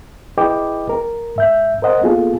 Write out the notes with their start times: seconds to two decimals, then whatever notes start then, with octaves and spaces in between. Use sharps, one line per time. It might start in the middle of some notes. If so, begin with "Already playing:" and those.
0.38 E4 G#4 B4 D#5 G5 D6
0.89 A#4
1.36 G#2 E5 G6
1.82 A#4 C5 D#5 F#5
2.01 A#3 B3 F4 G#4 A4